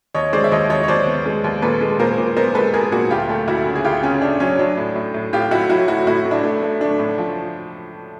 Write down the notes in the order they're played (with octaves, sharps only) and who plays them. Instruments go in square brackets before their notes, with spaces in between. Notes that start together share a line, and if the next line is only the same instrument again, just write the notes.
[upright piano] D#2 C#5 D#5
G#3 C5 D5
E5
D#2 C#5 D#5
D#2 C#5 D#5
C#5
D#2 C5 D5
B3
G#3
D#2
A#2 A4 B4
G#3
A#2 A#4 C5
A#2
B3 A#4 C5
G#3 A4 B4
B3 G#4 A#4
A#2 F#4 G#4
D2 F4 G4
A3
D2 E4 F#4
C#3
G#4
D2 F4 G4
C#3 C#4
C#3 D4
F#3 C#4
F#3 D4
A2
A2
A2
A2 F4 G4
A2 E4 F#4
F#3 E4 F#4
A3 E4 F#4
A2 E4 F#4
A2
D4 E4
A3
A3
A3 D4
A2
F3